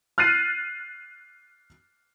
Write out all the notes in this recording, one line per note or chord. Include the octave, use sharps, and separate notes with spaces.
F6 F#6 A6 C7 D#7